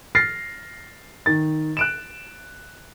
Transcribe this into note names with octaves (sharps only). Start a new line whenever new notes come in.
F6 A6 A#6 C7
D#3 A6
F#6 D7 E7